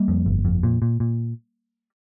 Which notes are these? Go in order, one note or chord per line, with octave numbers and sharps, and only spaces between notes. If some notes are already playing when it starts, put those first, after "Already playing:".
Already playing: G3 A#3
F2
G1
F2
A#2
A#2
A#2